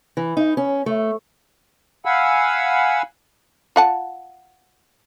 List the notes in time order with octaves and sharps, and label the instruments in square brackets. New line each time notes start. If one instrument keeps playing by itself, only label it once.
[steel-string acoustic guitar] E3
D#4
C#4
A3
[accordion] F5 F#5 G#5 B5 E6
[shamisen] F4 F#5 A5